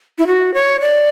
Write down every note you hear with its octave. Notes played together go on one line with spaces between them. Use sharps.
E4
F#4
C#5
D5